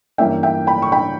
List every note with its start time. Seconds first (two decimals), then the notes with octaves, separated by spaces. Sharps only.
0.18 G2 E3 A#3 C#4 E5 G5
0.43 E5 G5
0.67 G5 B5
0.82 C#6
0.92 G5 B5